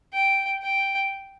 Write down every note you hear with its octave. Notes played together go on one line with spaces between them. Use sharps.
G5
G5